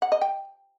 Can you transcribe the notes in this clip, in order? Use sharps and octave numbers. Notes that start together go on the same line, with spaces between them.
F#5
D#5
G5